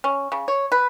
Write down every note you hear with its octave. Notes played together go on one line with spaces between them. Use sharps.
C#4
C#3
C#5
B4